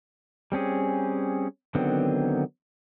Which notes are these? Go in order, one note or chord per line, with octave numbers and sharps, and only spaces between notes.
G3 C4 C#4 G#4
D3 D#3 F#3 B3 C4